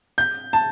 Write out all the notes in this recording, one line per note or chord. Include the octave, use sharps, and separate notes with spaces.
G6
A5